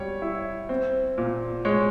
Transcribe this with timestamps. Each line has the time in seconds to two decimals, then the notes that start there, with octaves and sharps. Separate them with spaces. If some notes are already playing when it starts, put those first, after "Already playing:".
Already playing: G3 C#5
0.22 E4
0.69 C4
1.18 A#2
1.65 G#3 C#5